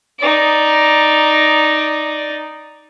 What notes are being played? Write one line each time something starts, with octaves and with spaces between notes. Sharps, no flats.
D#4 D5